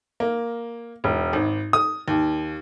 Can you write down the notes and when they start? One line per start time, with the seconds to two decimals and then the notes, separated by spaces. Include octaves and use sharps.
0.20 A#3
1.04 E1
1.33 G#1
1.73 D#6
2.08 D#2